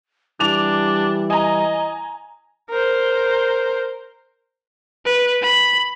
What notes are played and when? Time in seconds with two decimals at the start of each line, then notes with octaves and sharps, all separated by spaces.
0.40 E3 G3 D4 D6 F7
1.30 D#5 G#5 A#5
2.70 A#4 C5
5.05 B4
5.42 B5